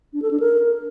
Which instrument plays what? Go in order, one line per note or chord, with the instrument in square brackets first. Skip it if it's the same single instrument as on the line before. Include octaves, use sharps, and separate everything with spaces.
[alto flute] D4
A4
D4
A#4